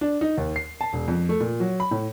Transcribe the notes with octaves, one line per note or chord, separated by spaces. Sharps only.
D4
D#4
D#2
C7
A5
E1
F2
A3
A#2
F#3
B5
A2